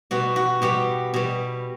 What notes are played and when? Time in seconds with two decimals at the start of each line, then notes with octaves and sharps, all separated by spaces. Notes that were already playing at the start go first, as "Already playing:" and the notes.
0.11 B2 G3 F#4
0.36 F#4
0.62 B2 G3 G4
1.14 B2 G3